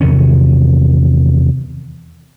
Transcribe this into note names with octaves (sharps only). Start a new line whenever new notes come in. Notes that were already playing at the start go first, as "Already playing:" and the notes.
E2 C3 D#3 C#4